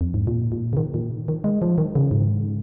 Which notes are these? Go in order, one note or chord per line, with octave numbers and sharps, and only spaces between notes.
F2
G#2
A#2
A#2
C#3
D#3
A#2
D#3
G#3
F3
D#3
C#3
G#2